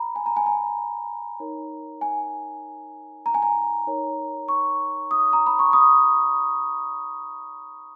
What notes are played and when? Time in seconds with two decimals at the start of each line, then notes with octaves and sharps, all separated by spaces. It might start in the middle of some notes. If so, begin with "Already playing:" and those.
Already playing: A#5 B5
0.16 G#5
0.26 A#5
0.37 G#5
0.46 A#5
1.40 D#4 A#4 C#5
2.01 G#5
3.26 A#5
3.34 G#5
3.42 A#5
3.87 D#4 A#4 C#5
4.48 C#6
5.11 D#6
5.33 A#5
5.47 B5
5.59 C#6
5.73 D#6